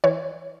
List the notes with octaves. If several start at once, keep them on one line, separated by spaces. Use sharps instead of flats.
E3 C#5